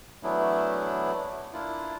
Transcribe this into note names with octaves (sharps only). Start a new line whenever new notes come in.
E3 F#3 A3 B3 D4 E4
A#3 D4 E4 F4